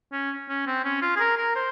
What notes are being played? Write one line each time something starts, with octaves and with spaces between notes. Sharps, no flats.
C#4
C#4
C4
C#4
F4
G#4
A#4
A#4
C5